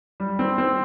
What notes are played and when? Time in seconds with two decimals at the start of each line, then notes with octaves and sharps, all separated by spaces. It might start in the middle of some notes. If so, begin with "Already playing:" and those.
0.20 G3
0.39 C4
0.58 C4